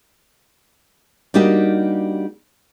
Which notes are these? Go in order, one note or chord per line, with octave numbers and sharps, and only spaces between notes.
G3 A#3 D4 D#4 F#4 G4